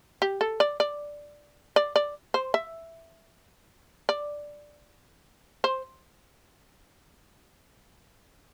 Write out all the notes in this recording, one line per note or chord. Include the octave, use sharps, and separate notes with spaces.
G4
A4
D5
D5
D5
D5
C5
E5
D5
C5